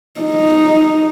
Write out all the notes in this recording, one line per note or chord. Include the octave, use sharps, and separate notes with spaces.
D#4